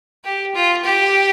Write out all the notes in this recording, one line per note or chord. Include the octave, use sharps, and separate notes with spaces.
G4
F4
G4